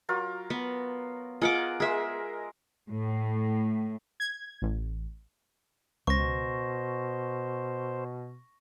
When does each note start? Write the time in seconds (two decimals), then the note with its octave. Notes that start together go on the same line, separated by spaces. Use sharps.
0.09 F#3 F4 A#4
0.50 B3
1.41 F4 G#4 A#4 D#5 F#5 D6
1.80 G#3 G#4 A#4 E5
2.88 A2
4.20 G#6
4.62 A1
6.07 C#2 B2 C5 C#6 A#6